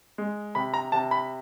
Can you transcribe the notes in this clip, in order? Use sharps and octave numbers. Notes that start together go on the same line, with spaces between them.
G#3
C3 B5
A#5
C3 A5
B5